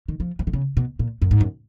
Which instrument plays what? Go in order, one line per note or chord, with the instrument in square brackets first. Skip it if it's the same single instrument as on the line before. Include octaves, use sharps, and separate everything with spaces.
[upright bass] D#3
F3
F3
D#3
C#3
B2
A#2
F#2
G#2
F#2